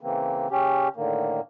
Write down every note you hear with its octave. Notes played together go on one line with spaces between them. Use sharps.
C#3 E3 A#3 C4
C#3 C#4 G4
A2 D3 D#3 A#3